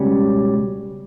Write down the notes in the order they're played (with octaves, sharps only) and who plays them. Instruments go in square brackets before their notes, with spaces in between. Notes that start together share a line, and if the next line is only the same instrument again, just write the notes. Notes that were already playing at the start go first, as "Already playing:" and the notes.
Already playing: [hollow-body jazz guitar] C#2 B2 G3 C#4